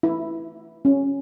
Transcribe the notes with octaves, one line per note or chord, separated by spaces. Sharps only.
E4
C#4